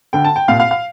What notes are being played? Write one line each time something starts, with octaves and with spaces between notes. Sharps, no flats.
D2 D3 G5
A5
G5
C2 A#2 F5
F5
F5